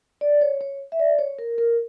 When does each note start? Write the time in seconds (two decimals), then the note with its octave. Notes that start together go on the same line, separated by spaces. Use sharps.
0.21 D5
0.41 C#5
0.61 C#5
0.92 E5
0.99 D5
1.19 C#5
1.39 A#4
1.58 A#4